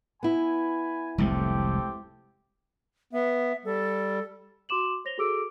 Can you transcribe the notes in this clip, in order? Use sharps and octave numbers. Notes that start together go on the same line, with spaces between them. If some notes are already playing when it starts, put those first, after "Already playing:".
B3 E4 G#5 B5
F1 C2 A2 G#3 C4 G4 A4
B3 E5
G3 A4
F#4 C6 D6 E7 F#7
C5 C#5 A#6 F7 G7
F#4 G#4 A4 D6 E6 D7